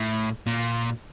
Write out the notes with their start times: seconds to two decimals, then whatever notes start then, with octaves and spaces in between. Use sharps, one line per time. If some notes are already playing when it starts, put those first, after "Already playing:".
Already playing: A2
0.46 A#2